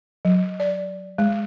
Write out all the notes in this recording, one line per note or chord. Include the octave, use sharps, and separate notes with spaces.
F#3
D5
G#3